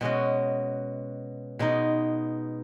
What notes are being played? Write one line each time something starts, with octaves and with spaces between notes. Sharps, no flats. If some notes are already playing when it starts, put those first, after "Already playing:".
B2 G#3 C#4 F#4
B2 G#3 D#4